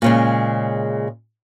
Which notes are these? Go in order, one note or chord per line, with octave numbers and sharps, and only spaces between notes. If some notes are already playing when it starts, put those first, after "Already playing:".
A#2 C#3 G#3